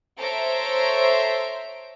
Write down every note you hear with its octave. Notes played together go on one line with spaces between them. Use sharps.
A4 C5 C#5 E5 A#5 D7